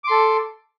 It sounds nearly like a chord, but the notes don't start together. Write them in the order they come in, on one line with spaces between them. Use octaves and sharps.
D6 C6 A4